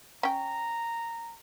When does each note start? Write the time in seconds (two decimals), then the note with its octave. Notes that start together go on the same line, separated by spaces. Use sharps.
0.23 C#4 G5 A#5